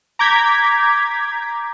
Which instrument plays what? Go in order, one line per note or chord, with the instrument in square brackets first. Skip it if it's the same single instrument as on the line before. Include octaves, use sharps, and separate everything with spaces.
[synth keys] A#5 D6 G6 G#6 B6